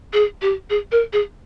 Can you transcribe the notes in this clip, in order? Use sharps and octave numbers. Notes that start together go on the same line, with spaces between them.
G#4
G4
G#4
A#4
G#4